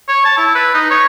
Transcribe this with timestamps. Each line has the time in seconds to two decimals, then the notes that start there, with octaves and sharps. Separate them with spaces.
0.09 C#5
0.25 A5
0.38 E4
0.55 B4
0.74 D#4
0.91 C#5